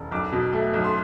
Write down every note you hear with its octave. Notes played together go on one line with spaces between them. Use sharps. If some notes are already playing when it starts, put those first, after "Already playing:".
Already playing: E1
B1 D6
B2
A3
B1
C6